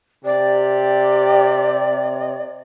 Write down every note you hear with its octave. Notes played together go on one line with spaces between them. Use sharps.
C3 G4 D5